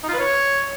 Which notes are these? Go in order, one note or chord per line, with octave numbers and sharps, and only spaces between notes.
D#4
F4
B4
C#5